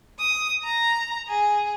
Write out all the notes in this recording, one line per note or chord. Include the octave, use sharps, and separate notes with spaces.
D#6
A#5
G#4